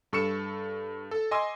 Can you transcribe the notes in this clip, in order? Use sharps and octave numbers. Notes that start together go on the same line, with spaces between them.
G2 A4 C#6 E6 C#7 E7
A4
D#5 G#5 C6 D6 E6